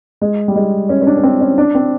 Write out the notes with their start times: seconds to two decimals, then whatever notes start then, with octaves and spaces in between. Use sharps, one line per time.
0.21 G#3
0.48 G3
0.56 G#3
0.89 C#4
1.02 C#4
1.07 D4
1.17 C#4
1.23 C4
1.40 C#4
1.58 D4
1.75 C4